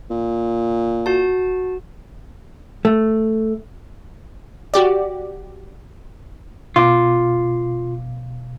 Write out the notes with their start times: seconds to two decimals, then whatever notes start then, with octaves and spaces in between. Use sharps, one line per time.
0.10 A#2
1.06 F#4 A5
2.85 A3
4.74 F#4 G4 D5
6.76 B2 F4 F5 D6